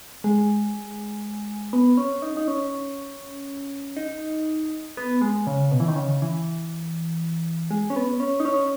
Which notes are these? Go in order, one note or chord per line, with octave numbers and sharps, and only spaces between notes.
G#3
B3
C#4
D#4
D#4
C#4
D#4
B3
G#3
C#3
B2
E3
D#3
C#3
E3
G#3
C#4
B3
C#4
D#4
C#4